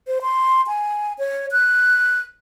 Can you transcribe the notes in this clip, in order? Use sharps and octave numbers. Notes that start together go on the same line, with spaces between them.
C5
C6
G#5
C#5
F#6